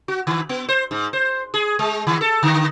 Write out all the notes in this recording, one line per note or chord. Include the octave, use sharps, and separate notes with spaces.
F#4
D#3
B3
C5
G#2
C5
G#4
G#3
D#3
A4
D3